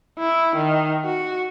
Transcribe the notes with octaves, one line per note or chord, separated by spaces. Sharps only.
E4
D#3
F#4